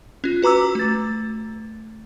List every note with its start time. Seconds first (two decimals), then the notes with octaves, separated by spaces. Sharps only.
0.24 C#4 F4
0.42 F#4 B4 A#5 D6 E6
0.75 A3 A6